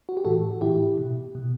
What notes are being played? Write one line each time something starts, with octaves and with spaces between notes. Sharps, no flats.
F#4
G4
A2 E3 F#4 A4
A2 E3 E4 G4
B2
B2